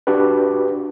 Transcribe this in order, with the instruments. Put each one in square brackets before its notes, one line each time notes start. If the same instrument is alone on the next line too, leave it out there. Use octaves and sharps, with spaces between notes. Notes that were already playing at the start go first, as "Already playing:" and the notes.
[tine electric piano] D4 F#4 G4 B4